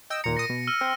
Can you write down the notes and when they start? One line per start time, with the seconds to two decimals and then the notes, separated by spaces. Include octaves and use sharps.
0.10 D#5 G5 E6
0.24 D#2 A#2 A#5 C#7
0.37 A#2 D#6 A#6 D#7
0.49 B2
0.67 E6 F6 D#7
0.81 C4